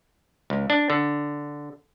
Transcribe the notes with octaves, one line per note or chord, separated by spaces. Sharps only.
C#2
D4
D3